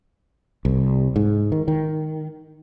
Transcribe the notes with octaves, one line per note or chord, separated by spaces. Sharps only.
C2
G#2
D#3
D#3